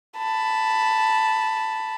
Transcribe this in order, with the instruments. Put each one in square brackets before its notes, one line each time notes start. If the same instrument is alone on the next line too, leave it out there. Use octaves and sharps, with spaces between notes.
[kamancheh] A5 B5